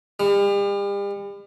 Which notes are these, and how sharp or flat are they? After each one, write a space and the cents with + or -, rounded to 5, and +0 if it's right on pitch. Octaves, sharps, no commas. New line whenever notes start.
G3 +40